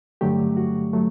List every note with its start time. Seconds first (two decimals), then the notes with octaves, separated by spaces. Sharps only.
0.21 G2 D3 F#3 A3 G4
0.57 F#4
0.93 F#3 A3